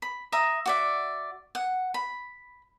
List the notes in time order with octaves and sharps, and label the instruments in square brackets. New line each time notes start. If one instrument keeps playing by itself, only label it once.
[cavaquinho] B5
E5 A#5 D#6
F#4 D5 E5
F#5
B5